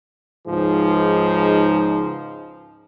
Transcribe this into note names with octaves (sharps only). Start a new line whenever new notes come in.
C#2 G#2 F3 D#4 G#4